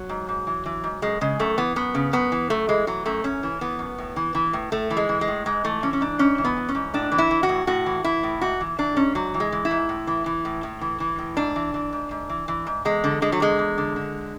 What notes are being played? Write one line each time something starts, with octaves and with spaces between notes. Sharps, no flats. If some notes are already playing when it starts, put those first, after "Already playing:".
Already playing: F#3
G#2
G#2
E3
E3
G#2
F#2 G#3
C#3 G#3
F#2 A3
E3 B3
F#2 B3
C#3
F#2 B3
E3
F#2 A3
E3 G#3
E3 F#3
F#2 A3
F#2 C#4
E3
E3 B3
F#2
A2
E3
E3
A2
A2 A3
E3
G#3
E3
G#3
A2
G#2 G#3
E3 A3
E3 C#4
C#4
G#2 D4
G#2 C#4
E3
B3
E3
C#4
G#2
A2 D4
E3
E4
E3
F#4
A2
A2 F#4
E3
E3 E4
A2
G#2 F#4
E3
E3 D4
G#2 C#4
G#2 F#3
E3
G#3
E3
E4
G#2
A2
E3
E3
A2
A2
E3
E3
A2
G#2 D4
E3
E3
G#2
G#2
E3
E3
G#2
E2 G#3
D3
D3 G#3
F#3
E2 G#3
E2
D3
D3